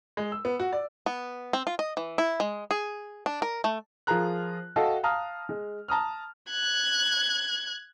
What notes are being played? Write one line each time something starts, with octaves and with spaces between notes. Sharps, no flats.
G#3
E6
B3
F#4
D5
B3
C4
F4
D#5
E3
E4
G#3
G#4
D4
A#4
A3
F3 F4 G#4 A#4 A#5 F#6
F#4 A4 D#5 F5 G5
F5 A5 A#5 D#6 F6
G#3
A5 A#5 D#6 F6
F#6 G#6